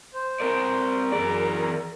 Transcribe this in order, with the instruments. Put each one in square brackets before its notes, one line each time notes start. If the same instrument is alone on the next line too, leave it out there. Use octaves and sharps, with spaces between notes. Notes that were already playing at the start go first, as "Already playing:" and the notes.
[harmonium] C5
[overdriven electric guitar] C4 D5 [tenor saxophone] A#4
[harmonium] F#2 A#5 [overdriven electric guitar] E3 D5 [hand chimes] G#4